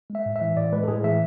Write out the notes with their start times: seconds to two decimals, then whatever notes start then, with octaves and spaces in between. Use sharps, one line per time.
0.10 G#3
0.15 E5
0.26 A2
0.36 E5
0.41 E3
0.56 A2 D5
0.73 G#3 B4
0.84 A4
0.88 A2 G#4
1.04 E3 E5